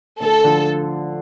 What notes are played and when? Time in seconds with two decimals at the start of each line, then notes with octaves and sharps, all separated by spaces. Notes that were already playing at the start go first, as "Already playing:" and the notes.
0.20 D2 A4
0.44 D3 F3